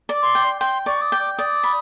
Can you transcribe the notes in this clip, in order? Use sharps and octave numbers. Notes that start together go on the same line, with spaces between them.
D5
C6
G5
G5 C6
D5 C#6
D#6
G5 D6
D5 D#6
B5